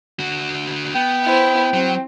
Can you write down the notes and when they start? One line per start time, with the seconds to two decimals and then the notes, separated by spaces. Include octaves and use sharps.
0.19 D3 F#4
0.95 B3 G5
1.24 E4 C5
1.74 F#3 C4